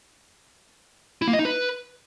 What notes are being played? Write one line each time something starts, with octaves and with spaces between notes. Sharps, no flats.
E4
A#3
D#5
D#4
B4